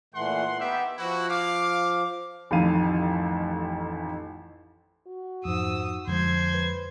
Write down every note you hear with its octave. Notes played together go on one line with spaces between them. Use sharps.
A#2 E3 A3 F#5 C6
B3 D#4 G4 E5
F3 E4 F#4
F5 D6
A1 F2 D#3 F5 D#7
F#4
F2 G#2 D#6 E6
F2 D3 F3 G#3 C5 G#6
B4